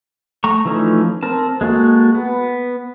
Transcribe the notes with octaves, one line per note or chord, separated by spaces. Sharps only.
A3 A#5 C#6
E3 F3 A3 C#4 D#4
C4 A#4 A5
G#3 A#3 F#4 A4
B3